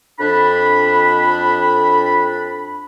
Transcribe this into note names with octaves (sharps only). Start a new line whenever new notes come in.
F2 D4 B5